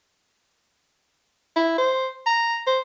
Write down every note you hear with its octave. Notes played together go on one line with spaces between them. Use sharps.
E4
C5
A#5
C5